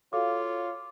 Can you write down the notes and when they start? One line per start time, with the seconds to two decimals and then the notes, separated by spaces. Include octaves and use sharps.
0.13 F4 F#4 A4 C#5 F5 D6